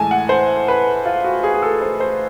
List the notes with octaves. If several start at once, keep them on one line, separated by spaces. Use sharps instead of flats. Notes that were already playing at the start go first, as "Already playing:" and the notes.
Already playing: A2 E3 G#3 G#5 A5
F#5
C5
B4
F4
F#4
G#4
G#4
A4
C5
C5